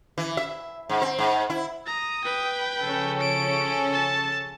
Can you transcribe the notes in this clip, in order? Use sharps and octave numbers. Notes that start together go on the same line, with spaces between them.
E3
E5
G#2
C4
G#2
E4
A#5 D#6
B4 G5
C#3 F3 C#4 A4
D7
A5